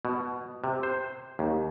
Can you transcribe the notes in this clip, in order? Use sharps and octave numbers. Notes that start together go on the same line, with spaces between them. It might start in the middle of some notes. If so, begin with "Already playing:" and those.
B2
C3
C5
D#2